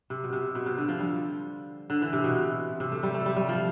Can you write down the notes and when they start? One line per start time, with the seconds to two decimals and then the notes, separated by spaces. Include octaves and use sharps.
0.10 C3
0.24 B2
0.33 C3
0.55 B2
0.66 C3
0.78 D3
0.88 F3
1.00 G3
1.90 D3
2.02 E3
2.13 C3
2.24 B2
2.35 C3
2.80 C3
2.92 A3
3.03 G3
3.14 A3
3.26 G3
3.37 G3
3.49 F3